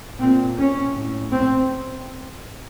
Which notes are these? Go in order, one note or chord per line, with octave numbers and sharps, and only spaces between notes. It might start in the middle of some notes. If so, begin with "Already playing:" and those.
A#2 C4
C#4
A2
C4